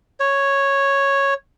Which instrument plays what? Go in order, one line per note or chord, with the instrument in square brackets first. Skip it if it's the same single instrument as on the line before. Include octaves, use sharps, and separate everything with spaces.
[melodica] C#5